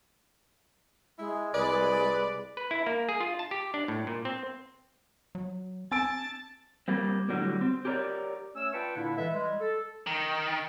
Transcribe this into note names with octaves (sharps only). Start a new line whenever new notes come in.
G#3 E4
C2 G#4 B4 D5
B4
E4
A#3
G#4
F4
A5
G4
D4
A2
A#2
C4
F#3
C4 G#5 A5 E6 A6 D7
G3 A#3 C4
A2 D3 F#3 G3 A#3
C4
G4 G#4 A#4 B4 C#5 D5
A3 C#4 C#5 E6
F4 B4 D5 G5 A5 C#6
A#2 D3 A#3 D4 E4
E3 G#3 E4 A4 B4 E5
G3 G#3
A4
D#3